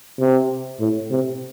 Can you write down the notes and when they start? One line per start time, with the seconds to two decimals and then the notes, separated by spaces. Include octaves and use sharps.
0.19 C3
0.80 A2
1.11 C3